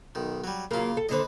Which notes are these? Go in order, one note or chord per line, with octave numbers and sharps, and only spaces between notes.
B1 D#3
F#3 G3
C#3 F#3 A#3 F4
A4
D#2 D3 B4 C5 D#5